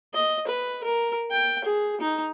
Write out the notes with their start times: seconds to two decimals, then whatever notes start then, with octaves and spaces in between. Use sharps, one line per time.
0.14 D#5
0.47 B4
0.84 A#4
1.31 G5
1.64 G#4
2.01 D#4